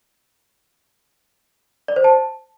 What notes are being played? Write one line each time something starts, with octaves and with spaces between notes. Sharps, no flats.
D5
C5
A5